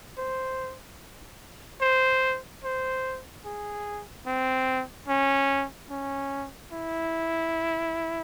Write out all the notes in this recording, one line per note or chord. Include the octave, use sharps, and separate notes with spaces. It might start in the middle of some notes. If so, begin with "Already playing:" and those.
C5
C5
C5
G#4
C4
C#4
C#4
E4